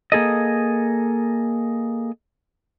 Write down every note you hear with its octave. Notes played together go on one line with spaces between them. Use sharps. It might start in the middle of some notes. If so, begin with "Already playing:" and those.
A#3 G#4 A4 D#5